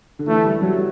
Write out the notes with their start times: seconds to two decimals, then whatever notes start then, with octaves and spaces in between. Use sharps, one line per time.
0.19 D3
0.28 E3 A3
0.45 G3
0.62 F#3